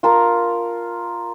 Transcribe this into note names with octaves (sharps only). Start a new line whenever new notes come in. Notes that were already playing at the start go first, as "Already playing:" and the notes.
F4 A#4 A5 A#5